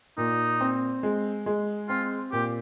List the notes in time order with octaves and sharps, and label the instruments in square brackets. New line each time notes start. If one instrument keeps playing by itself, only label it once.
[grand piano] A#2 [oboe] D#4
[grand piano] C4
G#3
G#3
[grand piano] C4 [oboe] F4
[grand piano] A#2 [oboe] G4